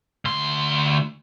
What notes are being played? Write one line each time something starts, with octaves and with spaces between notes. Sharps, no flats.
D2 C6